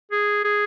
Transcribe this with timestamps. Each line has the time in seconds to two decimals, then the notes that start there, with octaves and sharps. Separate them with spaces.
0.11 G#4
0.44 G#4